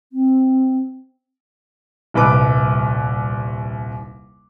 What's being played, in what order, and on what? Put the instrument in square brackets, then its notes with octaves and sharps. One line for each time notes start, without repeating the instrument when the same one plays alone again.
[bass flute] C4
[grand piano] D#1 C2 B4 D6